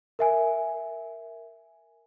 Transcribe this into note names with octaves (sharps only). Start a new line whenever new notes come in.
A#4 E5 G#5